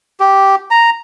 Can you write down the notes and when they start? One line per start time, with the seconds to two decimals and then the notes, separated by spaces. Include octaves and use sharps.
0.20 G4
0.71 A#5